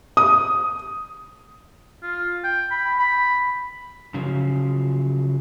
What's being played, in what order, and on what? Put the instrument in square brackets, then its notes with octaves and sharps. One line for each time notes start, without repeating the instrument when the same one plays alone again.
[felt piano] D#6
[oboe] F4
G5
B5
B5
[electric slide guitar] C#3 F3 F#3